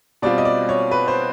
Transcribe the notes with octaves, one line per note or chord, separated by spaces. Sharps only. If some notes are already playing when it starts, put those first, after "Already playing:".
B2 G3 C4 F4 D5
D#5
D5
C#5
B4
C5